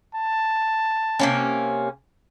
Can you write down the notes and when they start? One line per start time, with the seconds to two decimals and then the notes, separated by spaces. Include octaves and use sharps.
0.15 A5
1.19 C3 A#3 C#4